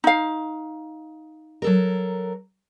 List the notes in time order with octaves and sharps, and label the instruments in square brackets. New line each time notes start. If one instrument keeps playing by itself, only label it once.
[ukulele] D#4 F5
[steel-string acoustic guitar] F#3 A4 A#4